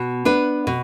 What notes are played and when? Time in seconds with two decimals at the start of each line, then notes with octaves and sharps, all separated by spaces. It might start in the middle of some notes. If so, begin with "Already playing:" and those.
Already playing: B2
0.25 B3 D4 B4
0.67 B2